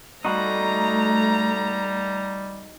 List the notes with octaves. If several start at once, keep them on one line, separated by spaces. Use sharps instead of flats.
G3 A3 D#4 F#4 A#5